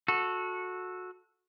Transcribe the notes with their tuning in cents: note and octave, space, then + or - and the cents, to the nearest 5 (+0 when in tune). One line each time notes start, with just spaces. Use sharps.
F#4 -20 A4 +0